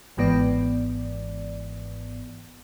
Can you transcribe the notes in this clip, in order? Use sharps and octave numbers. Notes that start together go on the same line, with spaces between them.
G#1 G#2 E3 B3 D5